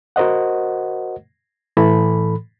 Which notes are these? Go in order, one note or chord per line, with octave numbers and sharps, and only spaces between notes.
F#4 A#4 C5 D#5 F#5
A2 E3 A4 B5